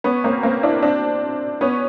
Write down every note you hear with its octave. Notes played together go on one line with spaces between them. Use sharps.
B3 C#4
A#3 C4
A#3 C4
D4 E4
C4 D4
B3 C#4